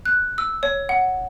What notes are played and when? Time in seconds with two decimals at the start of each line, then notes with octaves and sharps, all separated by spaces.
0.05 F#6
0.38 E6
0.63 C#5
0.89 F#5